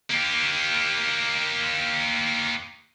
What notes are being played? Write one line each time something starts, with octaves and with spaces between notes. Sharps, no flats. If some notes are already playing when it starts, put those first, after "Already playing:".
A#3 G4